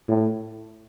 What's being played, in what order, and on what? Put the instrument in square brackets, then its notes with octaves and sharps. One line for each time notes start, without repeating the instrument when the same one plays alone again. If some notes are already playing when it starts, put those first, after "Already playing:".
[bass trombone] A2